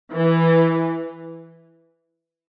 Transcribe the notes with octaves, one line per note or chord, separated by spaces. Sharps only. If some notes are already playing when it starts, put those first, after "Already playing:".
E3